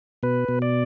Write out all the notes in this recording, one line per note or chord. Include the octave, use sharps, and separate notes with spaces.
B2 B4
B2
D5